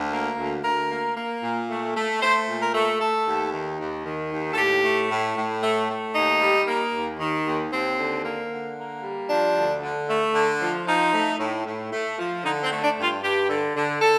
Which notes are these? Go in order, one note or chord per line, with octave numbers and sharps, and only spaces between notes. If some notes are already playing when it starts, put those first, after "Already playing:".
Already playing: D2
A#3
D2
D2 A#4
A#3
A#3
A#2
A3
A3
A3 C5
A#2
A#4
A3
A3 A4
D#2
D#3
D#2
D#3
D#2
A4
A2 G4
A3
A2
A2
A3
A3
D#2 D#4
G3
A#3
D#2
D#3
D#2
D#2 C4
D3
A#3
D3
A#3
G3
F3 D4
D2
D3
A3
D3
F3
F3 D#4
A3
A2
A2
A3
F3
D3 D#4
C4
A3
D4
G2
F4
G2 G4
D3
D3
D3 A4